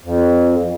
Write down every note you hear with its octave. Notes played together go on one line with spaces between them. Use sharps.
F2